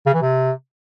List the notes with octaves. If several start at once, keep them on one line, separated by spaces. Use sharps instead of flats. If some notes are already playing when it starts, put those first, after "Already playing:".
C#3
E3
C3